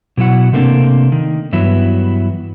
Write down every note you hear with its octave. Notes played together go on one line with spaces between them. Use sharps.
B2 F#3 E4 F#5
C3 A3 A#3 C4 D4
D#3
G2 E3 F#3 B3 E4